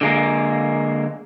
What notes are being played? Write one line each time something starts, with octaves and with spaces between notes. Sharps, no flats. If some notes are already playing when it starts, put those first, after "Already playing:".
D3 G#3 A#3